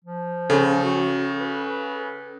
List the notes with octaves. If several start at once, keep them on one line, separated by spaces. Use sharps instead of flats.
F3
C#3 C#4 A4
F#4
B4